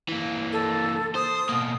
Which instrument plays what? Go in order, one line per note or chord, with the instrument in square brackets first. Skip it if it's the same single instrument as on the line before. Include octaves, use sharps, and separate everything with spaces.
[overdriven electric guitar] E3 A#3
[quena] A4
[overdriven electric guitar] C5 [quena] D#6
[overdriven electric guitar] B2 A#3